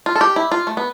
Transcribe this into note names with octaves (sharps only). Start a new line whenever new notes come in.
F4
A4
G4
E4
F4
A3
B3